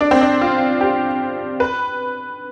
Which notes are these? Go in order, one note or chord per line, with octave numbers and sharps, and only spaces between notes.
D4
C4
D4
F4
G4
B4